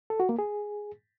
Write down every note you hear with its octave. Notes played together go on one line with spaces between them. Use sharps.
A4
F#4
A#3
G#4